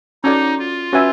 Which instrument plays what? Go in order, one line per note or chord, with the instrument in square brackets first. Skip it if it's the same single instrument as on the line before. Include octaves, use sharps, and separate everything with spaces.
[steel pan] C#4 F#4 A4 D5 [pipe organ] D#4
[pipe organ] F4
[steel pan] C#4 F#4 B4 E5 G#5